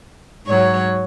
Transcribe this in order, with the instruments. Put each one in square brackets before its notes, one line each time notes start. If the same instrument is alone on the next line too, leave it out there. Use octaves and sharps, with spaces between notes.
[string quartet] G#2 F#3 C#5